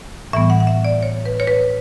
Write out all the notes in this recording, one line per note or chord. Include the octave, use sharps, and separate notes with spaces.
A2 E3 G3 B3 E5
F#5
F#5
E5
D5
C#5
B4
C#5
B4